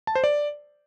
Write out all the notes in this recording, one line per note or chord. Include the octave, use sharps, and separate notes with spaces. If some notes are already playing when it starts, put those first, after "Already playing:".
A5
C5
D5